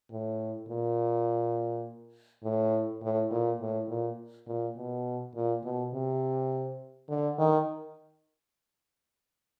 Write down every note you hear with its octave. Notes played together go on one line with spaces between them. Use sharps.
A2
A#2
A2
A2
A#2
A2
A#2
A#2
B2
A#2
B2
C3
D3
D#3